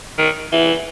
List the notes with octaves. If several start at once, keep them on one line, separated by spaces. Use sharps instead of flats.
D#3
E3